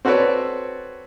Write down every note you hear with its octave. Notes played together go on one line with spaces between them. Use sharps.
C4 F#4 A4 B4 C#5 D5